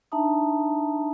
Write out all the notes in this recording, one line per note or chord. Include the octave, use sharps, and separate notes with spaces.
D4 D#4 E5 A5 A#5 D#6